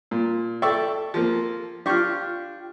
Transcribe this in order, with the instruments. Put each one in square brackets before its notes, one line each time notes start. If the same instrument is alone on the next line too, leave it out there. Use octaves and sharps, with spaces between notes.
[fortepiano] A#2
[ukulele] A4 G5 [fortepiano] D5 E5 C#6
[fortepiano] F3 A#3
[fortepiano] D4 C#6 [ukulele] F4 G4